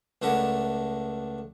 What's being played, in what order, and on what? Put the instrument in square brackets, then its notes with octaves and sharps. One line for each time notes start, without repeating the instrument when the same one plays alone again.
[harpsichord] C#2 A3 D4 A#4 E5 F#5